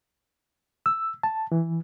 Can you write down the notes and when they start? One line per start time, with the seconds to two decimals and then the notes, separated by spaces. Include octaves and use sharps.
0.86 E6
1.23 A5
1.52 E3